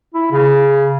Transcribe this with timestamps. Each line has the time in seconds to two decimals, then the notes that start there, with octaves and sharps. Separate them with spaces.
0.14 E4
0.31 C#3